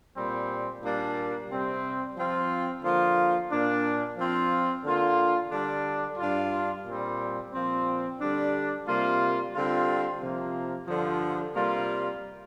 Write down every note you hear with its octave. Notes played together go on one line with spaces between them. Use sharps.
A#2 G3 C4
A#2 G3 A#3 D4
C3 G3 C4
F3 C4 F4
D3 F3 A#3 F4
A#2 A#3 D4
F3 C4 F4
D3 A#3 F4
D3 G3 D4
G2 G3 D4 F4
A#2 G3 C4
A#2 F3 C4
D3 G3 D4
C3 G3 A#3 F4
D3 G3 C4 F4
C3 F3 A#3
G2 D3 F3
C3 G3 A#3 F4